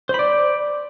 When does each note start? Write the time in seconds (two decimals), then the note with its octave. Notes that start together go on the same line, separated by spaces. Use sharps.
0.09 C5
0.14 B5
0.19 D5